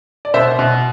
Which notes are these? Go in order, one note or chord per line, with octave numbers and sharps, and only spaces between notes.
D5
B2 C5 E5
B2